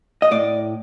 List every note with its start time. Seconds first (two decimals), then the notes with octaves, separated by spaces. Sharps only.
0.22 D#5
0.31 A2 D5